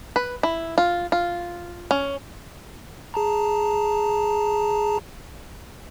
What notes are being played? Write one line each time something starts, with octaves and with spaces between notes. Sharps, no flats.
B4
E4
F4
F4
C#4
G#4 A5 A#5